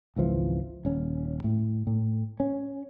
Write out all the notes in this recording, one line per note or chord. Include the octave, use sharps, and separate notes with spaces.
G#1 C#2 E3 F3
D#1 C#4
A2
A2
C#4